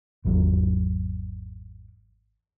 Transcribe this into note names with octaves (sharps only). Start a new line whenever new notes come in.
G#1 E2 F#3